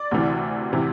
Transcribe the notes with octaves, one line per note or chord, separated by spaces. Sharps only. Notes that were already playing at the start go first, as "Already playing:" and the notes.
Already playing: D5
D2 C3 E3
C3 E3